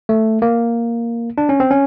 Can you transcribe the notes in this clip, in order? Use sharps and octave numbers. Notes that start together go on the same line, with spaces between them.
A3
A#3
D4
C#4
C4
C#4